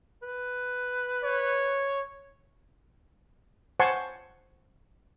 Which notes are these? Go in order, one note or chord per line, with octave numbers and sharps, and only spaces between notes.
B4
C#5
C5 F#5 G#5 A5 C6 C#6